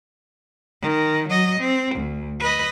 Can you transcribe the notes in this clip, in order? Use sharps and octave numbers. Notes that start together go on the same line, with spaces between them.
D#3
F#3 D#5
C4
D2
B4 D#5